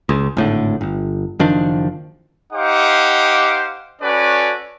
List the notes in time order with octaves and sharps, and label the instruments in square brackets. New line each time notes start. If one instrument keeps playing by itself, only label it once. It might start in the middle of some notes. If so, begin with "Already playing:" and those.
[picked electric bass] C#2
G#1 A2 D3
G1
F#1 D#3 F3 D4
[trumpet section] D#4 G4 C5 F5 F#5 D6
C#4 F#4 A4 B4 D5